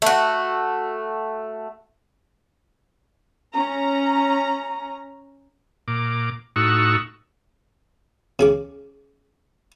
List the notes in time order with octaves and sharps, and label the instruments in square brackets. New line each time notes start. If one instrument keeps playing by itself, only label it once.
[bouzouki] A3 F#4
[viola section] C#4 A#5
[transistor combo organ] A#2 D6
A2 D#4 F#4 C#6 E6
[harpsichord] C#3 G#4 D6